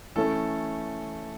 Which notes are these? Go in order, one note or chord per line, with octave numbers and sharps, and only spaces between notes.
E3 A3 C#4 A4